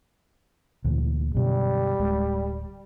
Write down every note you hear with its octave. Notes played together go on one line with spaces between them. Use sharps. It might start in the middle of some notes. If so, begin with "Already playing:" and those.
D2 A#2 E3
F#2 B2 D3 G3
D1 G#3